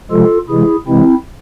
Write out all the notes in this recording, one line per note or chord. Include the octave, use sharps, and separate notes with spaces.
C3 F3 G#3 F4 A4
C3 E3 G#3 E4 G#4
C3 E3 G#3 C4 E4